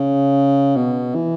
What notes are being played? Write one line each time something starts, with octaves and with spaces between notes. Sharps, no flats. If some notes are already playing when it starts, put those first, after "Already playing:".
Already playing: C#3
B2
E3